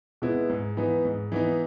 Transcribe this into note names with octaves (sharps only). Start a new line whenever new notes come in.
B2 G#3 B3 E4
G#2
E3 B3 D#4
G#2
E3 B3 D#4